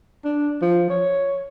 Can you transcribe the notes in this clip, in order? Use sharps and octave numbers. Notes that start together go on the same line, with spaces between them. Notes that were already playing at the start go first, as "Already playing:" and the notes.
D4
F3
C#5